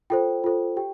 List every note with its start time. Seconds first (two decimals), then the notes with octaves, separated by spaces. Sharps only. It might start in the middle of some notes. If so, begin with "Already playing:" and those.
0.10 F4 A4 C5 G5
0.44 F4 A4 C5
0.77 G4 G5